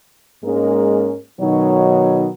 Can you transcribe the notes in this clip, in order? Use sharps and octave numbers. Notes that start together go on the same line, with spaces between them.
G#2 G#3 A#3 C#4 A#4
B2 D#3 F#3 D#4 C#5